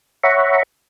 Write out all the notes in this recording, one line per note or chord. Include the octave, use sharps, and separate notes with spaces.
C#5 E5 F#5 A#5 B5 C#6